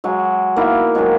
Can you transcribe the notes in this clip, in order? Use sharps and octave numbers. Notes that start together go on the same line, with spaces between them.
F#3 G#3
A#3 B3 D#4 E4
D#3 F3 F#3 G#3